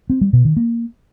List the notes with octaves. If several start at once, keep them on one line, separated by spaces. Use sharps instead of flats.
C4
G3
B2
D#3
A#3